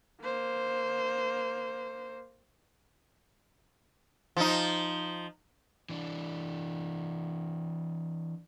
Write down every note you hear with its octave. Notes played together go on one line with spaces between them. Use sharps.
A#3 C5
F3 D#4
E3 D4